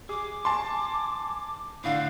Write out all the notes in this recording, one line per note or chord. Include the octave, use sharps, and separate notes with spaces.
G#4 D6
G#5 A5 C6
A2 D3 F5